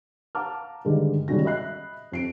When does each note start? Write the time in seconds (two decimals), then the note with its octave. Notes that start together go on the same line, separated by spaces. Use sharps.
0.35 F5 F#5 A5 A#5 D6 F6
0.85 G2 D3 D#3 G#3
1.28 D#3 G3 G#3 C#4 F#4 A#6
1.44 D#5 E5 B5 F#6 C7
2.12 F2 C7 D7